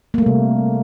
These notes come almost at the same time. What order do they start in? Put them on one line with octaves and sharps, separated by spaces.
A#3 A3 G3 C3